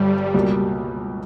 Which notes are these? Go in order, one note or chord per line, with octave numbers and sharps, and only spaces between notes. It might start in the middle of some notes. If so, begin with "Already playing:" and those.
Already playing: G1 G2 G3
C#2 B2 G3 A#3